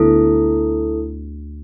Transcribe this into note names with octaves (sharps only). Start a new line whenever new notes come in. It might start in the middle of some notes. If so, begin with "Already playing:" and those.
Already playing: D2 D3 B3 E4 A4